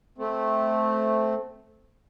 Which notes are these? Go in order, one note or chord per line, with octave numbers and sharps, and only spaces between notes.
A3 C4